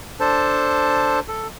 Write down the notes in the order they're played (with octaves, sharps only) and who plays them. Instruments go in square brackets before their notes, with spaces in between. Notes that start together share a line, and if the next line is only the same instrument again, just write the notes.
[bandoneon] D4 A4 C5 A5
A4